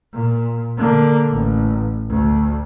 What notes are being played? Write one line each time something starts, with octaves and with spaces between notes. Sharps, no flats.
A#2
D3 A#3
A1
D2